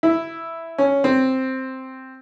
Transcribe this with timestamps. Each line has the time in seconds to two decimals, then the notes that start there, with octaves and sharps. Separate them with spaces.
0.03 E4
0.78 C#4
1.04 C4